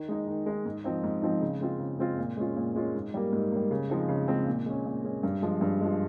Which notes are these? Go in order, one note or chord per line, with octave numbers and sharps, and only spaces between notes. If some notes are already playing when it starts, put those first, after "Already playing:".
Already playing: D#3
G#3 D#4
D#3
G#3 D#4
G#2
F3 C4 D#4
G#2
F3 C4 D#4
C#3
G#3 C4 F4
C#3
G#3 C4 F4
A#2
G#3 C#4 F4
A#2
G#3 C#4 F4
G#2
G3 A#3
G#2
G3 A#3
C#3
F3 G#3 C4 D#4
C#3
F3 G#3 C4 D#4
A#2
G#3 C#4
A#2
G#3 C#4
G2
F3 G#3
G2
F3 G#3